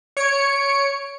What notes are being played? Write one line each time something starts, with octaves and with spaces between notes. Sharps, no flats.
C#5 C#7 D7